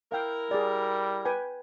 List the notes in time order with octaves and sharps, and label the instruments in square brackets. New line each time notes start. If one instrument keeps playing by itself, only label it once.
[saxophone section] E4 A#4 [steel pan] F5 G5
[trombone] G3 [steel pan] G#4 D5
[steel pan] B4 G5 G#5